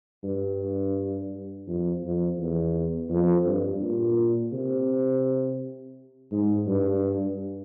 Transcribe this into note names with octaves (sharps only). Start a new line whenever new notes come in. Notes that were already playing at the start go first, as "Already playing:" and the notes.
G2
F2
F2
E2
F2
G2
A#2
C3
G#2
G2